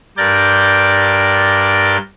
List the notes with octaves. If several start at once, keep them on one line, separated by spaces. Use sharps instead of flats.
G2 A#4 D5 G5 G6 A6